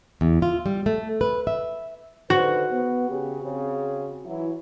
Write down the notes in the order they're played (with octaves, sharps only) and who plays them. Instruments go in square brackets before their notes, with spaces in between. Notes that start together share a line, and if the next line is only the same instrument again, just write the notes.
[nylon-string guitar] E2
F4
G3
A3
B4
E5
[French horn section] D3 B4 C5 [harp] F#4
[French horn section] B3
C#3 G4
C#3 C4
E3 F#3 E4